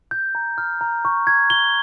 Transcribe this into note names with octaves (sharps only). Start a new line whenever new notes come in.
G6
A#5
F6
A#5
C#6
G#6
G7